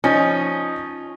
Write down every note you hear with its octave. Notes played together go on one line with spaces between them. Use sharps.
F3 C#4 D#4